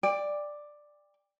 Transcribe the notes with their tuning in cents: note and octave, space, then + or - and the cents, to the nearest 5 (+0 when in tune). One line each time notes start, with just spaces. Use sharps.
D5 +5 G5 +30